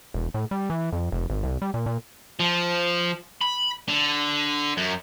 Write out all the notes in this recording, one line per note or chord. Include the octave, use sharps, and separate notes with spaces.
E1
A2
G3
E3
F2
F1
G#1
C2
G3
A#2
A#2
F3
B5
D3
F#2